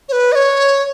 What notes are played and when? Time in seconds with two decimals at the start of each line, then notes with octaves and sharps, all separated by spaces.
0.09 C#5
0.12 B4
0.32 D#5
0.35 C#5